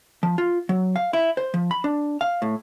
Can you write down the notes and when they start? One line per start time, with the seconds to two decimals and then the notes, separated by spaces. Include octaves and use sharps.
0.23 F3
0.38 F4
0.69 F#3
0.96 F5
1.13 E4
1.37 C5
1.54 F3
1.71 B5
1.84 D4
2.21 F5
2.42 A2